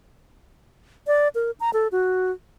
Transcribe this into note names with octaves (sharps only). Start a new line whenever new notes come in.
D5
A#4
A#5
A4
F#4